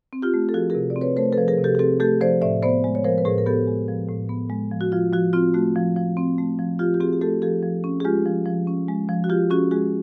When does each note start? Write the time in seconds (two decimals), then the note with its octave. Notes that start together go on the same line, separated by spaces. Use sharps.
0.13 C4
0.22 F4 G4
0.34 A3
0.49 A4
0.54 F3 F#4 G#4
0.70 C3 G#4 A#4
0.90 D5
0.96 C4
1.01 B4 C#5
1.17 A3 A#4 C5
1.33 F3 A4 B4
1.48 G#4 A#4
1.58 C3
1.64 G4 A4
1.75 G#4
1.79 C4 G4 A4
2.00 A3 G4 A4
2.21 F3 C5 D5
2.42 A2 D5 E5
2.63 B3 C5 D5
2.84 G#3
2.95 C#5
3.04 F3 A#4 C5
3.18 B4
3.25 A2 G#4 A#4
3.38 A#4
3.46 B3 G4 A4
3.67 G#3
3.88 F3
4.09 A2
4.29 B3
4.50 G#3
4.71 F3
4.81 F#4
4.92 F3 F4
5.12 F3 F#4
5.33 C4 F4
5.54 A3 F#4
5.76 F3
5.96 F3
6.17 C4
6.38 A3
6.59 F3
6.79 F3 F4 G4
6.94 G4
7.00 C4 F#4 G#4
7.13 G#4
7.21 A3 G4 A4
7.42 F3 G4 A4
7.63 F3
7.84 C#4
8.00 G#4
8.05 G#3 F4 G4
8.26 F3
8.46 F3
8.67 C#4
8.88 G#3
9.09 F3
9.24 F#4
9.29 F3 F4 G4
9.50 C#4 F#4 G#4
9.71 G#3 F#4 G#4